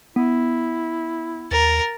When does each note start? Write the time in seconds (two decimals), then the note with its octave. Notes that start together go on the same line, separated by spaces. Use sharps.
0.16 B3 E4
1.51 D#2 A#4 A6